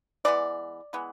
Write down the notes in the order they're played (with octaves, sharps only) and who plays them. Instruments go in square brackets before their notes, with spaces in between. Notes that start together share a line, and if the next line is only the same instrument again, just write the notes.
[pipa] E3 G#3 B3 D5
E3 G#3 B3